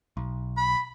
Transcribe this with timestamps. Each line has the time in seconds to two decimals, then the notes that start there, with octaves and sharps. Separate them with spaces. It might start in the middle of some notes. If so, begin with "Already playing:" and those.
0.17 B1
0.57 B5